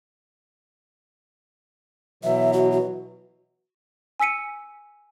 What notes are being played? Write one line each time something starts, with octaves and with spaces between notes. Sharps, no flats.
B2 E3 F#3 E5
F#4
F#4
G#5 E6 B6 C#7 D#7